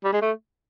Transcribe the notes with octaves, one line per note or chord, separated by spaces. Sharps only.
G3
G#3
A3